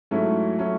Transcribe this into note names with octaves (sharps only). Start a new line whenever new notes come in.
G#2 F#3 A3 C#4 E4
F#3 A3 C#4 E4